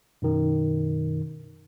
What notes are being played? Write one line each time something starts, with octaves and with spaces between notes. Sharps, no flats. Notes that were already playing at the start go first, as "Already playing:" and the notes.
F#2 B2 D#3